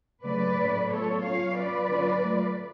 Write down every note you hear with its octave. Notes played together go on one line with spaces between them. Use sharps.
C#3 F#3 A3 B4 D5
A2 F#3 A3 C#4
F#3 B3 F4 A4 C#5
F#3 C#4 F4 C#5 F5
F#3 C#4 F4 B4 D5
D3 F#3 C#4 F4
F#3 A3 F4